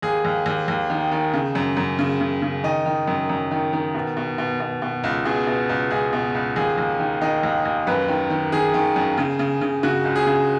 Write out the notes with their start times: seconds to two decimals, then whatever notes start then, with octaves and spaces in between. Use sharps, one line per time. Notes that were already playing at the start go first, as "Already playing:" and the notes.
0.02 D#2 G#4
0.25 D#2
0.46 D#2
0.68 D#2
0.90 D#3
1.12 D#3
1.34 C#3
1.55 F#2
1.77 F#2
1.99 C#3
2.21 C#3
2.42 C#3
2.64 D#3 D#5
2.86 D#3
3.07 F#2
3.29 F#2
3.51 D#3
3.73 D#3
3.95 B2
4.17 B2
4.38 B2
4.60 B2
4.82 B2
5.04 C#2
5.25 B2 G#4
5.47 B2
5.69 C#2
5.90 C#2 G#4
6.13 B2
6.34 C#2
6.56 D#2 G#4
6.78 D#2
7.00 D#3
7.22 D#3 D#5
7.43 D#2
7.65 D#2
7.87 F#2 B4
8.08 D#3
8.30 D#3
8.52 D#3 G#4
8.74 D#3
8.96 F#2
9.18 C#3
9.39 C#3
9.61 C#3
9.83 C#3 F#4
10.05 C#2
10.16 G#4
10.26 C#3